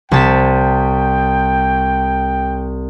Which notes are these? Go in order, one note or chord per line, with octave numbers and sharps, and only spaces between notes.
C2 G5 A5 B6